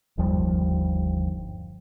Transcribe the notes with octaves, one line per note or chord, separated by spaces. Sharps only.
G1 D#2 F3 G3